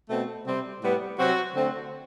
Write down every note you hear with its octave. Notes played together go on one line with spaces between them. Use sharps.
B2 A3 C4
C3 G3 C4
A2 G3 B3
C3 F#3 C4 F#4
D3 A3 C4